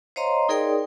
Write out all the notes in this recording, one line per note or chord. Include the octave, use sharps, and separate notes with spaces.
C5 C#5 D#5 F5 A#5 C6
D#4 G#4 A#4 D5 G5 D#6